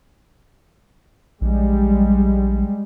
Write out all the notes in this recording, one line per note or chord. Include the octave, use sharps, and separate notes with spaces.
A#1 G3 G#3